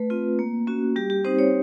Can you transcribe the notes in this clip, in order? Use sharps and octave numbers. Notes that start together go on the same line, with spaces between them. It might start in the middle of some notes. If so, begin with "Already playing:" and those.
Already playing: A3 B4
C4 F4
A#3
C#4 F#4
G3 G4
G4
C4 D#4 C5
C#5